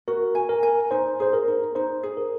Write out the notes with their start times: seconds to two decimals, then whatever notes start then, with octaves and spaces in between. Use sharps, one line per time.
0.08 F#4 A#4
0.35 G#5
0.49 A#4
0.63 G#5
0.91 D#4 C5
1.20 G#4 C5
1.33 A#4
1.48 D#4
1.75 D#4 C5
2.03 G#4
2.17 A#4